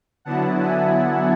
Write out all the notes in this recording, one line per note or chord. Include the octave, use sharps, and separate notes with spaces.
D3 F#3 B3 E4 F#5 A5
E5 G#5